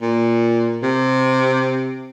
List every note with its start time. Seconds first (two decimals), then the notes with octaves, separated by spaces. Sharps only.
0.02 A#2
0.83 C3